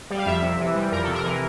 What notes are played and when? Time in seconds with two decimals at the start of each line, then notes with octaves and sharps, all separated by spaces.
0.10 G3
0.18 F5
0.26 F2 E5
0.42 C3
0.59 E3
0.75 G3
0.92 F2 A#4
1.03 C3 A4
1.14 A#4
1.24 E3